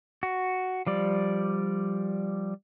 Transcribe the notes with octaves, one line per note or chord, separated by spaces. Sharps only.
F#4
F3 G3 D5